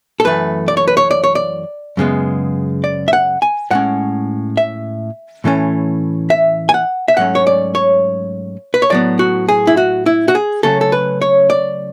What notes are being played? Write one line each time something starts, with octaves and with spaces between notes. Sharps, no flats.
A4
F#2 E3 A3 B4
D5
C#5
B4
C#5
D5
C#5
D5
F#2 C#3 G#3 B3
D5
E5
F#5
G#5
A2 G#3 C#4 F#5
E5
A2 E3 A3 C#4
E5
G#5
F#5
E5
G#2 F#3 A3 C#4 F#5
C#5
D5
C#5
B4
C#5
A2 F#3 B3 D5
F#4
G#4
E4
F#4
E4
F#4
G#4
C#3 F#3 A3 C#4 A4
A4
B4
C#5
D5